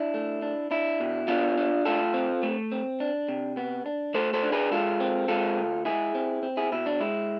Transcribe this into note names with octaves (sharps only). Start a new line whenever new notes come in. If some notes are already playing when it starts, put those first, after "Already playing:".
Already playing: D4 E4
A3
D4
D4 E4
B2
B3 D4 F4
D4
A3 F4 A4
C4
A3
C4
D4
C3
B3
D4
A3 A4 C5
A4 C5
D4
G#4 B4
G#3 F4 A4
C4
G#3 F4 A4
D2
G#3 E4 G#4
C4
C4
E4 G#4
B2 E4
D4
G#3 E4